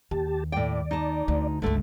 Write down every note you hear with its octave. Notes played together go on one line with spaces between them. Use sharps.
D#2 G4 A5
A2 D5 G5
D#4 A5
D2
G1 C#2 D3 A3